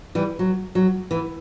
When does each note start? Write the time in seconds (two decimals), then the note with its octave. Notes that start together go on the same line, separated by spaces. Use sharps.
0.15 E3 G3
0.39 F#3
0.75 F#3
1.11 E3